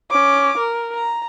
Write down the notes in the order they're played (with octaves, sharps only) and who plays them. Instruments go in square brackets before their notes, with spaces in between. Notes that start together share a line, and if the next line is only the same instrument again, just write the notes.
[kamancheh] C#4 D6
A#4
A#5